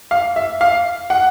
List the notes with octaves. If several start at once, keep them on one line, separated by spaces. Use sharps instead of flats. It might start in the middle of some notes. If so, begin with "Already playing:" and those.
F5
E5
F5
F#5